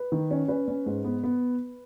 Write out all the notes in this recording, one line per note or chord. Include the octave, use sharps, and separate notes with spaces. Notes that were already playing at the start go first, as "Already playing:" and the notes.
Already playing: B4
D#3
C#4
C#4 B4
C#4
G#2
B3
B3